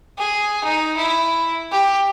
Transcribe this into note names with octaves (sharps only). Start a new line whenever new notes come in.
G#4
D#4
E4
G4